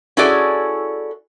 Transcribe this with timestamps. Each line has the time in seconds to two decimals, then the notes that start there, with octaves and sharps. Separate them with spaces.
0.17 C#4 E4 F#4 G#4 A4 D5